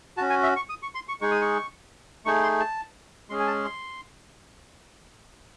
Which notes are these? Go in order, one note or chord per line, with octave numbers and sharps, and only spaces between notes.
C#4 F#4 A5
G#5
E5
C#6
D#6
C#6
C6
C#6
G#3 D#4 G#4 C#6
D#6
C#6
A3 D#4 G#4 C#6
C6
A5
G#3 C#4 G#4 C6
G#5
A5
C6